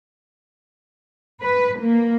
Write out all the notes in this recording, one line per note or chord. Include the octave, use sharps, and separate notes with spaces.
B4
A#3